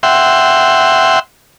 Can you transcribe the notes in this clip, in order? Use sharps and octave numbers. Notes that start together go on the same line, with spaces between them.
E5 F#5 G5 C6